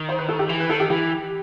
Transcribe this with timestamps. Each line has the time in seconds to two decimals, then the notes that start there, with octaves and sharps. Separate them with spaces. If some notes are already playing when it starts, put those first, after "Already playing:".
Already playing: D#3
0.09 C5
0.19 B4
0.29 A4
0.39 G4
0.49 E3
0.60 B4
0.70 D#3 A4
0.80 G4
0.90 E3 G4